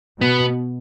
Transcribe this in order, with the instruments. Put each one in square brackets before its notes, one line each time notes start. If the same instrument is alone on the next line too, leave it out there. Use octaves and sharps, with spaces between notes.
[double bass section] B2 [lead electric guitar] B3